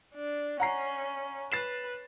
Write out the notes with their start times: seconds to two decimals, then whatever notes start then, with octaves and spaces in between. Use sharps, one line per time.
0.14 D4
0.60 C#4 F#5 A#5 C7
1.52 B4 A6 C7 E7